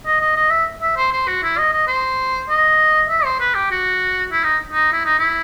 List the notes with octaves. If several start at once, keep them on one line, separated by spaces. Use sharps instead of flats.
D#5
D#5
D#5
E5
E5
C5
C5
F#4
E4
D#5
D#5
C5
D#5
E5
C5
B4
G4
F#4
E4
D#4
D#4
E4
D#4
E4